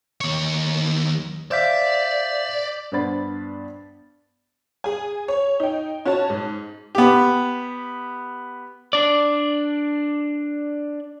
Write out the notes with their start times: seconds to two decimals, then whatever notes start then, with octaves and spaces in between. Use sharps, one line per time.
0.21 D#2 C#5
1.51 C5 D5 E5 F5 D6 G6 B6
2.92 G2 B3 D4 C5 B5 A6
4.84 G#4 G#5
5.28 C#5
5.60 D#4 G5
6.05 C#4 F#4 C#5 A5
6.30 G#2
6.95 B3 G4
8.93 D4 D5